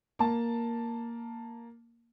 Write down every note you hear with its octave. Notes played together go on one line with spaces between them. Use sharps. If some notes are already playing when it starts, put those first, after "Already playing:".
A#3 A5